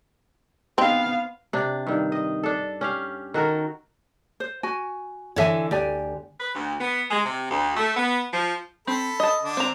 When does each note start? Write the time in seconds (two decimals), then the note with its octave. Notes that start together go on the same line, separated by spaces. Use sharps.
0.78 B3 C4 D#4 F5
1.53 C3 D4
1.87 G2 D#3
2.12 D#5
2.43 D4 A4
2.81 C#4 G4 F5
3.34 D#3 F#4 A4 A#4
4.40 C5
4.63 F#4 G#5
5.36 D3 E3 C#5 E5 G#5
5.71 D2 G4 D5 G#5
6.40 B4
6.54 D2
6.80 B3
7.10 G#3
7.24 C3
7.50 D2
7.77 A3
7.96 B3
8.33 F3
8.87 C4 A4 B5
9.20 D#5 A5
9.42 D3 D4
9.57 C4 A#5